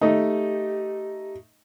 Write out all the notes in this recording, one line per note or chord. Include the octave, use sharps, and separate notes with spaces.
A3 D#4 G4